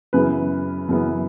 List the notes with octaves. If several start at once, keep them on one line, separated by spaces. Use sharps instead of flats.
F#2 C#3 E3 B3 B4
F#2 C#3 E3 B3